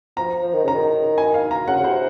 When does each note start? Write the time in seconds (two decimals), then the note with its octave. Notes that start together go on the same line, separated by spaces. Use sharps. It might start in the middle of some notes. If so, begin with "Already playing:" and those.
0.17 F3 A#5
0.43 F3
0.54 D#3
0.64 C#3 A#5
0.75 D#3
1.18 G#5
1.34 F5
1.51 A#5
1.68 C#3 F#5
1.80 C#3
1.84 C3 C5